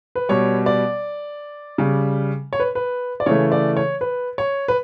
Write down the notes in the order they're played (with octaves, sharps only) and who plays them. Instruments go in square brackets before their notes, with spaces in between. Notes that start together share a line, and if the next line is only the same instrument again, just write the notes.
[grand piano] B4
B2 G3 C#5
D5
C#3 G3
C#5
B4
B4
D5
C#3 E3 A3 C#5
D5
C#5
B4
C#5
B4